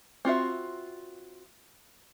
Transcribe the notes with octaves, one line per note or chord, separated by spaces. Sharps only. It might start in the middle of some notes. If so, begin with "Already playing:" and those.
C4 F4 F#4 E5